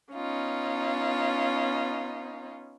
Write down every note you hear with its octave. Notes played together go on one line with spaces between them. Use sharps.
B3 C#4 D#4 F4